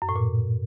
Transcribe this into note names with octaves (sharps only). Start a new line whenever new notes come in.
F#2
A2
A#2